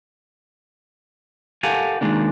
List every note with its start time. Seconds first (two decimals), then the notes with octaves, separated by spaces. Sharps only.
1.63 G4 A4 A#4 F5 F#5 G#5
2.01 D#3 G#3 A#3 D4